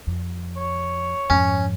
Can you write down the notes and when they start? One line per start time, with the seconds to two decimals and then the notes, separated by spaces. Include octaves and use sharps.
0.07 F2
0.57 C#5
1.30 F2 G#2 C#4